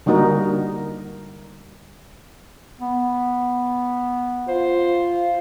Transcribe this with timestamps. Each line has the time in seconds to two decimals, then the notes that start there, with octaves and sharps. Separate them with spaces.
0.06 D3 G3 A#3 D#4 F#4 A#4
2.81 B3
4.48 F4 C5